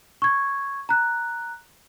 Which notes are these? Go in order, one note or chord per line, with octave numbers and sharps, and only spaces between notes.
C#6 G#6
A#5 F#6